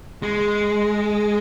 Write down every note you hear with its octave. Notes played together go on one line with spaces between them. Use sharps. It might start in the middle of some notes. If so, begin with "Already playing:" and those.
G#3